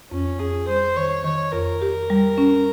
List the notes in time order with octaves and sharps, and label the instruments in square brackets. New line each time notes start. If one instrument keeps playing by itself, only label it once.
[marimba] F2 [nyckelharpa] C#4
[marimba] F2 [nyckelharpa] G#4
[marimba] G3 [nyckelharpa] C5
[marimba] D#3 [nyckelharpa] C#5
[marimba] D#3 [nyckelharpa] C#5
[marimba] F2 [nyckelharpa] A#4
[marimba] G4
G3
C#4